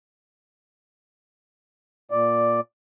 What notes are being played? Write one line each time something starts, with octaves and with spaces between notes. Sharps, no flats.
A#2 D5